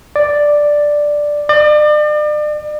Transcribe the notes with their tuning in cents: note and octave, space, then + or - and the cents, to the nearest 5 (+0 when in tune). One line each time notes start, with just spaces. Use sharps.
D5 +5
D5 +40